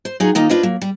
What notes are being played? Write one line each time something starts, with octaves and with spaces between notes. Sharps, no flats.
C5
F#3 D#4 F4 F#4 G#4
D#3 A#3 D#4 F4
D4 F4 B4 C5 D#5
F#3 A#3
G3